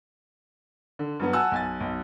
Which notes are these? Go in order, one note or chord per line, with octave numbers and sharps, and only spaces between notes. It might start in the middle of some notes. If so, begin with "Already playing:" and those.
D3
G2 F#3 B3
F#5 G#5 A5 E6 F#6
B1 G#5 A6
B1